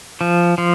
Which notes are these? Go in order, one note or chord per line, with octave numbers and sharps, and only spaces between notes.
F3
F3